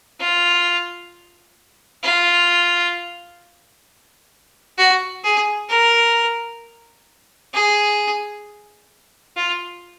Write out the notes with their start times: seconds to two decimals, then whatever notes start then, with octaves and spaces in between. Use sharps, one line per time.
0.20 F4
2.03 F4
4.78 F#4
5.24 G#4
5.69 A#4
7.54 G#4
9.36 F4